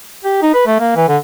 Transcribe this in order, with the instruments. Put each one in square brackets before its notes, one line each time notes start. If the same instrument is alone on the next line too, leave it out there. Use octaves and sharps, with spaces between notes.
[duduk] G4
D#4
B4
A3
A#3
E3
D3